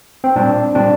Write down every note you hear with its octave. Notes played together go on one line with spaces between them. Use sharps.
C4
A#2 G3 C4 D4
A#2 G3 C4 D4